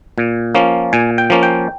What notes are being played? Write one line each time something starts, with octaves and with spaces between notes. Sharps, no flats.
A#2
F3 A#3 C#4
A#2 G#5
G5
F3 A#3 C#4
G5